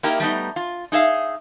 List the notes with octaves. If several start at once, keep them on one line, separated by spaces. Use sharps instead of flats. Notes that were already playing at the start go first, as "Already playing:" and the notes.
A#3 D#4 E4 G4 A#4
G3 A3 B3 D#4
F4
D#4 G#4 E5 F5